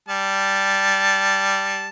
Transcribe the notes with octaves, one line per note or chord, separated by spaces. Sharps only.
G3 A5